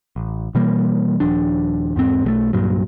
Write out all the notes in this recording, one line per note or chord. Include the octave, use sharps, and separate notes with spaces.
A1
B2 E3 G3 A#3
D#1 F3 D4
E2 G#2 C4
B1 G#3 A3
C2 G2 A#2 F#3